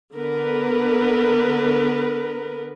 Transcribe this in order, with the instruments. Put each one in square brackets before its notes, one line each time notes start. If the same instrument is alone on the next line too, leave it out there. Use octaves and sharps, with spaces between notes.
[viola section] D3 B3 A#4 B4